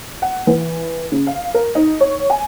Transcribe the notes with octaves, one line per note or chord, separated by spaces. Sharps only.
F#5
E3
C#3
F5
A#4
D#4
C#5
G#5